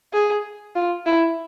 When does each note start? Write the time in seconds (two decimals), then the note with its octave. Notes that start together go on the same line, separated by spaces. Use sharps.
0.13 G#4
0.75 F4
1.06 E4